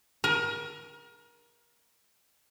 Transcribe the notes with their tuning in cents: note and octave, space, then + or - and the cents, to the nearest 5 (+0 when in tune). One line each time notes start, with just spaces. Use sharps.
A#4 +30